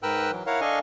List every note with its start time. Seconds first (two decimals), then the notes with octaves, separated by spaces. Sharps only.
0.03 G#2 A#4 B4 G5 E6 F#6
0.31 E3 F#3
0.47 E4 A#4 C#5 F5 F#5
0.61 D4 A4 D#5 F5 G#5 C#6